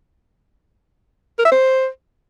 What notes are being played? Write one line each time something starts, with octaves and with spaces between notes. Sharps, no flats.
A#4
E5
C5